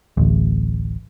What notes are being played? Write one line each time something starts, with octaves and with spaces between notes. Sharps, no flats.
D1 A1